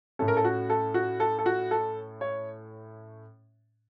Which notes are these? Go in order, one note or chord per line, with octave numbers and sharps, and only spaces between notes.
A2 A3 C#4 A4
A#4
A4
F#4
A4
F#4
A4
A4
F#4
A4
C#5